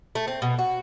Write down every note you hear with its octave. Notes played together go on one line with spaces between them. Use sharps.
A3
C4
B2
F#4